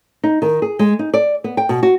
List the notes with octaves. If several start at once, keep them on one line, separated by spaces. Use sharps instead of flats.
D#4
D#3
G#4
G#3
D#4
D5
B3
G5
B2
F#4